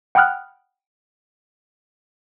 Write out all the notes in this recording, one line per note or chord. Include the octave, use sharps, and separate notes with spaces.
F#5 G5 B5 D#6 F6 F#6